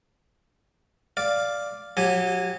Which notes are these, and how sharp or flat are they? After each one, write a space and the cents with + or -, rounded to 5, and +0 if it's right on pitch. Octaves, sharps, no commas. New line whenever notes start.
D5 +0 F5 +0
F#3 -30 G4 +0 G#5 +0